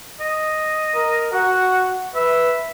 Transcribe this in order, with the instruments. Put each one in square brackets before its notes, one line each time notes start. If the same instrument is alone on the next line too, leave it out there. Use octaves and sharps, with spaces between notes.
[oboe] D#5
[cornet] A#4
[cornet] F#4 [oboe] F#5
[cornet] B4 [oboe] E5